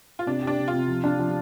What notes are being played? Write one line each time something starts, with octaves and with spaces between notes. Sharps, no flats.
F4
C3 D4
G4
D4
C3
F4
C3
F3
D4
F3